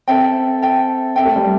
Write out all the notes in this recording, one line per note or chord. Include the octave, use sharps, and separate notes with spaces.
C4 A4 E5 G5
A4 E5 G5
C4 A4 E5 G5
A3
G3